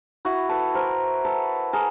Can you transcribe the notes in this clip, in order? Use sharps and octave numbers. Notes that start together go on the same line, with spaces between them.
E4 F#4
A4 B4
A#4 C5
A4 B4
G#4 A#4